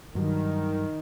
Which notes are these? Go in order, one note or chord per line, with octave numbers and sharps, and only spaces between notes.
G2 D#3 F#3